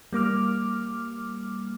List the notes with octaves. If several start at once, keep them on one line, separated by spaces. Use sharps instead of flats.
G3 A#3 D6 F6